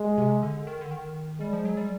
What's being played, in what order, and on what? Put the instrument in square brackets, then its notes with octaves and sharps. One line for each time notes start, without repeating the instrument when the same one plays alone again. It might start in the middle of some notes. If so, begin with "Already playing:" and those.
Already playing: [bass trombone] G#3
[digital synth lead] C3
D3
D#3
D3
D#3
[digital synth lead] G3 [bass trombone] G#3
[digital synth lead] F3
F#3
G3